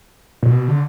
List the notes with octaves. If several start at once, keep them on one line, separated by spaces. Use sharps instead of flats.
A#2
B2
D3